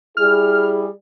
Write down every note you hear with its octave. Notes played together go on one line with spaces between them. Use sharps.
G3 E4 G#4 F6